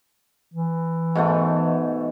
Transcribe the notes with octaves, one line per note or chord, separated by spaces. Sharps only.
E3
G#2 B2 A3